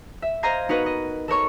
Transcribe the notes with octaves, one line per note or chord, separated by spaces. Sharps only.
E5
C5 D#5 F5 A#5 G#6 C7
B3 D#4 F#4 A#4 B4 D#5
D#5
A4 A#4 C#5 C#6